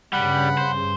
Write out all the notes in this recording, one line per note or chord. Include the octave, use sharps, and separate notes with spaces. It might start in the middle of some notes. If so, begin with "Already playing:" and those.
G2 C#3 G3 F#5 B5
C5